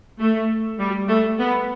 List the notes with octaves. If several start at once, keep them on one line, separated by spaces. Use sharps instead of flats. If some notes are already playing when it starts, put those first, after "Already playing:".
A3
G3
A3
B3